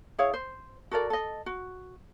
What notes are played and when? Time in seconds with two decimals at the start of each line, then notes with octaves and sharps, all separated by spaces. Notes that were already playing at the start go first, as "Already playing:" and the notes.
0.18 E4 G#4 C#5 F5
0.34 C5
0.91 F#4 A4 A#4 D5
1.10 A4 D#5
1.46 F#4